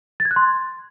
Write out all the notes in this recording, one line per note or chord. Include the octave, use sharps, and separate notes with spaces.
A6
G#6
F#6
C6